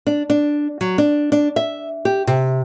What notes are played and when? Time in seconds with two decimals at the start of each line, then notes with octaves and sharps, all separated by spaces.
0.07 D4
0.30 D4
0.81 F#3
0.98 D4
1.32 D4
1.56 E5
2.05 G4
2.27 C3